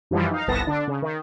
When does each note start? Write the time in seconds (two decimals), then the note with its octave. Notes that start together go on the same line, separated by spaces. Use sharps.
0.11 F#2 E3 F3 G3
0.31 D#4 F5
0.48 G1 C2 B3 A5 A#6
0.67 D3 D4
0.88 C#3
1.02 D#3